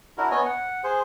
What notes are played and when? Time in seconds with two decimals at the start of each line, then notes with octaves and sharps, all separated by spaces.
0.18 D4 E4 F#4 A#4
0.31 B3 C#5 D#5 G#5
0.46 F#5
0.84 G#4 C5